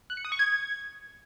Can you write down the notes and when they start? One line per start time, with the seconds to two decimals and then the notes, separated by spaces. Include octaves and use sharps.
0.10 F#6
0.17 C#7
0.25 D#6
0.32 C#6
0.39 G#6